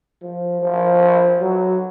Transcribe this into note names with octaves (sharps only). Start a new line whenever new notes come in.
F3
F3
F#3